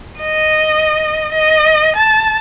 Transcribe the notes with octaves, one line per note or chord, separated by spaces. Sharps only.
D#5
D#5
A5